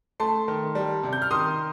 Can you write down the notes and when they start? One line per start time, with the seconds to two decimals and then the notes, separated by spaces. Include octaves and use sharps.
0.20 A3 A5 C6
0.48 D#3
0.75 G3
1.03 C3
1.13 G6
1.22 F6
1.31 D#3 C6 D#6